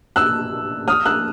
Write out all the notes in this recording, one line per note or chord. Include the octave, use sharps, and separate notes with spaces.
E6 F#6
D#6 F6
E6 F#6